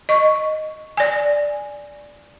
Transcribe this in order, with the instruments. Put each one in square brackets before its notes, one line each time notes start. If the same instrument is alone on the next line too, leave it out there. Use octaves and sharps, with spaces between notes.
[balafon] D#5 C#6
D5 G#5